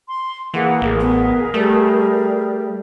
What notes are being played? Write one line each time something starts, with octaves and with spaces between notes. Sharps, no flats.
C6
E3 A#3 G#4 F#5
A1 G#4 A#4
B3
G3 A3